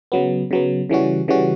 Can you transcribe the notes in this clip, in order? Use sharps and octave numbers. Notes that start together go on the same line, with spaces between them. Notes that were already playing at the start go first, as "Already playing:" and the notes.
C#3 F#3 B3
C#3 F#3 B3
C#3 E3 G3 C#4 F#4
C#3 E3 G3 C#4 F#4